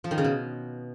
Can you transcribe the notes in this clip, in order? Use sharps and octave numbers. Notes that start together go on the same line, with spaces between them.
F3
D#3
C#3
B2